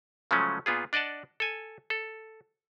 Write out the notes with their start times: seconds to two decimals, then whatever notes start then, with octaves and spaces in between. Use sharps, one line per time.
0.31 C#3 F3 F#3 G#3 A3 C#4
0.66 A#2 B3 F4 G#4
0.93 D4 D5 D#5 F#5 A5
1.40 A4 G#5
1.90 A4